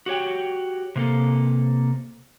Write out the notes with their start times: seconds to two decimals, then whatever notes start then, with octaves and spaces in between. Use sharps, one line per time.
0.06 F#4 G4 C#5 G5
0.96 C3 A#3 A4